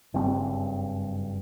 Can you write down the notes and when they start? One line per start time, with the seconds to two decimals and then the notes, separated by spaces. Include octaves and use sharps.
0.14 F#1 G2 C4